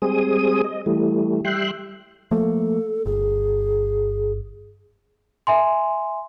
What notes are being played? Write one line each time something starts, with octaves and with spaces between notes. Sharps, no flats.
G3 G#3 C4 G#4 D#6
D#5
E3 G3 A3
G3 E5 G5 C6 F#6
F3 A3 A#3 A4
G1 G#4
E5 G#5 C6